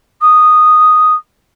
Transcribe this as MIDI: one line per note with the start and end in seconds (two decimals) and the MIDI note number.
0.21 1.14 87